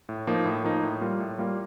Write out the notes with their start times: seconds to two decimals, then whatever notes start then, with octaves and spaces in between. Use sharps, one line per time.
0.09 A2
0.27 F3 A#3 D#4
0.45 A2
0.64 F3 A#3 D#4
0.83 A2
1.01 G3 A#3 F4
1.20 A2
1.38 G3 A#3 F4